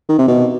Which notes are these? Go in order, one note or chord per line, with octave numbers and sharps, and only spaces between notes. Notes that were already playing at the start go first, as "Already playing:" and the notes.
D#3
C3
B2